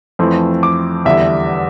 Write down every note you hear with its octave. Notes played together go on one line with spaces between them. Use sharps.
F2 E3 A3 C4
D6
E2 D3 G3 E5